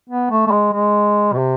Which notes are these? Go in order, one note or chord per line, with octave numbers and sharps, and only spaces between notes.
B3
A3
A3
G#3
G#3
B2
C3